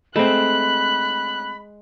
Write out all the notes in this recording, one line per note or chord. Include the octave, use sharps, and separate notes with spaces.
G#3 A3 C4 B5 F#6